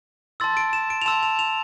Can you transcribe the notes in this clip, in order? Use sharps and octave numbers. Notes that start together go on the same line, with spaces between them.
A5 C6 E6 A6
D7
E7
D7
F7
A5 C6 E6 E7
F7
F7